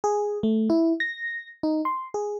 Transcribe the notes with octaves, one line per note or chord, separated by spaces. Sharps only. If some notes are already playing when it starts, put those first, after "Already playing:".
G#4
A3
E4
A#6
D#4
C6
G#4